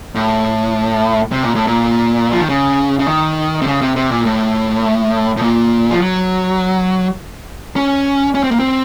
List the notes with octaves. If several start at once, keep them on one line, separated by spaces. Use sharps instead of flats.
A2
C3
A#2
A2
A#2
F3
D#3
C#3
C#3
D#3
C3
C#3
C3
C3
A#2
A2
A2
A#2
F3
F#3
C#4
C#4
C4
A#3
C4